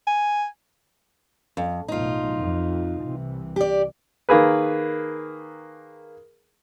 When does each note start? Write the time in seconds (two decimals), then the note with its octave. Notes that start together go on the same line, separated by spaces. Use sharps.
0.07 G#5
1.57 F2
1.88 A1 F#2 B2 D#4 F4
2.41 F2
3.06 C2 C3 E3
3.56 G4 D5
4.29 D#3 A#3 G#4 B4